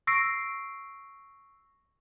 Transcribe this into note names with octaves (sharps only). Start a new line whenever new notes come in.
C#6 E6 A#6 C7 D7